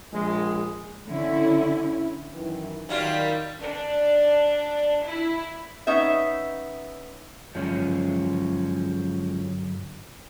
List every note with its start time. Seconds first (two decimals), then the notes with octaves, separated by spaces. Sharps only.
0.13 A#1 G#3
1.07 D3 C#4 E4
2.34 F#2 D#3 E3
2.89 D#3 F#3 G3 F4
3.61 D4
5.06 E4
5.87 B3 C#4 D#4 E5
7.55 G2 D3 F3 F#3 G#3 C#4